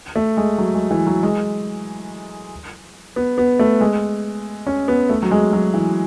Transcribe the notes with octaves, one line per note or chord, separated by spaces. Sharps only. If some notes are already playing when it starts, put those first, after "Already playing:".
A3
G#3
F#3
G#3
E3
F#3
G#3
B3
B3
A3
G#3
C#4
B3
A3
F#3
G#3
F#3
E3